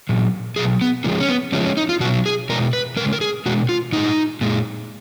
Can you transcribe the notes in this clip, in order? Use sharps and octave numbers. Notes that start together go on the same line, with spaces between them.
A#2 F#3
B2 F#3 G#4
B3
C#3 F3 G#3 A#3
C#4
B3
C#3 F3 G#3 C#4
C#4
D#4
F4
B2 F#3 F#4
G#4
B2 G#3 A#4
B4
C#3 G#3 A#4
A#4
G#4
B2 G#3 F#4
F4
A#2 G#3 D#4
A#2 G#3